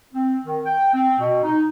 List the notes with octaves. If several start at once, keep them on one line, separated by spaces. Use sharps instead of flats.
C4
D#3
G5
C4
B2
D#4